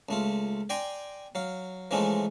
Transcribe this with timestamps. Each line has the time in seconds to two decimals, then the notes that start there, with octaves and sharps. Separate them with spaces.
0.09 C#2 A3 F4
0.70 D5 G5 G#5 A#5 C6
1.35 F#3 F5
1.91 E3 F3 G#3 A3 C#4 D#4